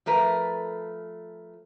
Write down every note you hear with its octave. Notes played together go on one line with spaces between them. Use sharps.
F3 A3 A#4 B4